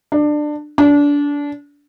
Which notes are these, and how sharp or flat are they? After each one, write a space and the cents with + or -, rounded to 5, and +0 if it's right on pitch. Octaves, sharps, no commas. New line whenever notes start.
D4 +20
D4 -25